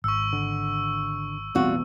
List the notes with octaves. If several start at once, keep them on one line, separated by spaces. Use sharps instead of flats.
G#1 C#6 E6
D3
A1 E2 B2 G3 C4 F4 F#4